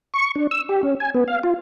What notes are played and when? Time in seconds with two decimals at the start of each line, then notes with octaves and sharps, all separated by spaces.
0.14 C#6
0.35 D4
0.51 E6
0.69 G4
0.83 C#4
1.00 G#5
1.15 B3
1.28 F5
1.43 F4